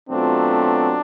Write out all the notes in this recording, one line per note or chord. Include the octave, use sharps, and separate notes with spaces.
B2 F#3 A3 C4 D4 F4